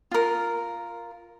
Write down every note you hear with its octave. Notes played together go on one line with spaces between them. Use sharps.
F4 A#4